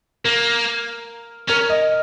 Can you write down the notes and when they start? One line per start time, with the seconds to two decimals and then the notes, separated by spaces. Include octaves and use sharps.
0.24 A#3 A#4
1.49 C#4 A#4
1.70 D#5